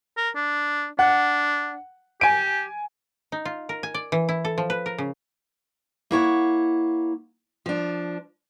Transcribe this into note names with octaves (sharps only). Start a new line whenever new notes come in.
A#4
D4
D4 F#5
G4 G#5 D7
D#4
F4
A#4
G#5
D5
E3
E4
A4
F3
B4
A#4
C#3
A#3 E4 C#5 F#5
F3 D4